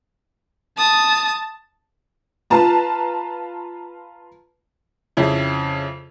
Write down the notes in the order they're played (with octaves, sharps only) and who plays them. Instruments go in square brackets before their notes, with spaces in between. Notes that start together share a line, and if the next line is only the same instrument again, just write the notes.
[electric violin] A5 [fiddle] D#6
[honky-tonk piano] F4 B4 A5 A#5
F2 C#3 E4